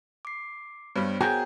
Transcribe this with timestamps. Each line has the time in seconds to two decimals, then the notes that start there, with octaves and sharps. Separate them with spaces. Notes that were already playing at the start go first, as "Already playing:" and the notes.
0.25 D6 C7
0.96 G2 G3 B3 C5 C#5
1.21 F#4 G#4 A#4 G5